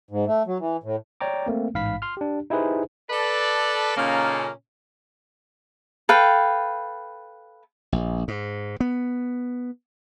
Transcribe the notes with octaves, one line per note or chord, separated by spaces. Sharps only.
G#2
A3
F#3
E3
A2
C#5 D5 G5 A#5 D6
A3 A#3 C4
A1 G#2 F5 B5 B6
C6 F6
D4 G4
D#4 E4 G4 G#4 B4 C5
A4 B4 D5
A#2 C#3 A#3 C#4 D#4 A4
A4 B4 F5 G5
A#1
G#2
B3